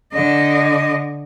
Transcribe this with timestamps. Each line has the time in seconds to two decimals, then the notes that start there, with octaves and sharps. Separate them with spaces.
0.12 D3 D#5